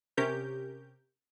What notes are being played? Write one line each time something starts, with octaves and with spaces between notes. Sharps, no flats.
C3 C#4 G4 A#4 G6